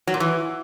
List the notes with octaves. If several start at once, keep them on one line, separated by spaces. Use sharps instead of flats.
F#3
A#2
E3